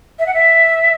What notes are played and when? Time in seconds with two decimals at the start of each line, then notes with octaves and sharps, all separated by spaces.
0.19 E5
0.27 F#5
0.34 E5